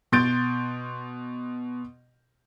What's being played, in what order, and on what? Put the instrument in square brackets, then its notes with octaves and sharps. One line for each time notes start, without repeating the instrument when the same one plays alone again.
[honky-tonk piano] B2 C6 G6 A6 D7